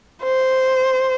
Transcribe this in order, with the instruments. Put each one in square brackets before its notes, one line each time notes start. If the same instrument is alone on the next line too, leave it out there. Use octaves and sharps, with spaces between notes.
[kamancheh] C5